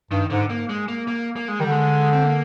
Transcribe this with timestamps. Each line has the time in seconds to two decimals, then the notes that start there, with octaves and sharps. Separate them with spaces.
0.11 G2 D#3
0.30 G#2 D3
0.50 A#3
0.69 G#3
0.88 A#3
1.08 A#3
1.36 A#3
1.48 G#3
1.59 D#3 G3
1.66 D3
1.71 G#3
2.13 C4
2.23 A#3